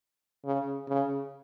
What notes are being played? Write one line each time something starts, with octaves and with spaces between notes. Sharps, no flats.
C#3
C#3